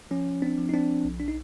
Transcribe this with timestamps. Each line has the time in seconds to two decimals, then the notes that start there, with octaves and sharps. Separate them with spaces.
0.11 F3 C#4
0.42 C4 D4
0.58 F3
0.69 D#4
0.74 C4 D4
1.05 B1
1.20 D4
1.28 D#4